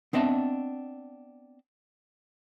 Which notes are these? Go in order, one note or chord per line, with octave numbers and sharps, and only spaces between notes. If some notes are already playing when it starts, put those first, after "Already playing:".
B3 C4 D4 D#5 E5 A5